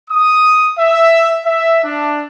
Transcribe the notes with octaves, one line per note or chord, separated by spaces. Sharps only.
D#6
E5
E5
D4